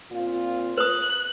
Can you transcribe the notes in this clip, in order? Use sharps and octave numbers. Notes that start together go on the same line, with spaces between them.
A#2 C4 F4
B4 D#6 F#6